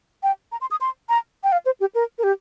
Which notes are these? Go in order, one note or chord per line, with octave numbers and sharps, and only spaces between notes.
G5
A#5
C6
D#6
C6
A#5
G5
F5
C5
G4
A#4
A#4
G4